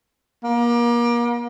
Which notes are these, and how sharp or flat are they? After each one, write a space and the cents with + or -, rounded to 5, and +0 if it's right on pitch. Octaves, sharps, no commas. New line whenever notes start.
A#3 +35